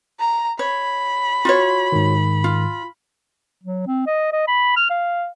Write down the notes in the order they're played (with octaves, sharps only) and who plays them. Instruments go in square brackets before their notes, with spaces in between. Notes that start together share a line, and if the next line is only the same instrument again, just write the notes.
[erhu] A#5
[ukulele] C#5 [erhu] B5
[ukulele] F4 F#4 C#5
[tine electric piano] G#2 D#3
[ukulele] F4
[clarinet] F#3
C4
D#5
D#5
B5
F6
F5